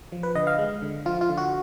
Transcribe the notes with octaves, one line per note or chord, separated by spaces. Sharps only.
F3
B4
D3 D#5
F5
G#3
D3
F3 F4
F4
D3
F#4